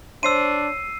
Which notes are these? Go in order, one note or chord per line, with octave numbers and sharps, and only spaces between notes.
D4 C5 C#5 C6 E6 C7 D#7